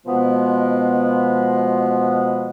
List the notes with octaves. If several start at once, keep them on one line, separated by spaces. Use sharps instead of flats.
B2 F3 G#3 B3